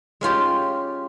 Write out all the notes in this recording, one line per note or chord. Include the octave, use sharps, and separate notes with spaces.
G#3 C#4 F4 G4